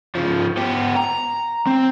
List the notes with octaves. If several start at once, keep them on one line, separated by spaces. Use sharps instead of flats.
C#3 F3
B3 G4
A#5
C4